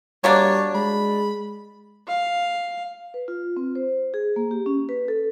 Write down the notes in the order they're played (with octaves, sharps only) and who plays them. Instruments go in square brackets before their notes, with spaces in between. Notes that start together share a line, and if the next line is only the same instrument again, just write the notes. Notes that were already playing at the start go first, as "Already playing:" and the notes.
[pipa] B2 A#3 D4 [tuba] G3 [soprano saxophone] C#5
[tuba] G#3 [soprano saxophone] B5
[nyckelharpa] F5
[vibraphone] B4
F4
C4
C5
G#4
A#3
G4
C#4
B4
A4